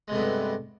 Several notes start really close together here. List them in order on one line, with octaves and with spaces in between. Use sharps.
G#3 C3 A3 B3 G2